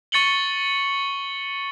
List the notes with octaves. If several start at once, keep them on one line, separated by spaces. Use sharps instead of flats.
C#6 A6 C#7 F#7 G7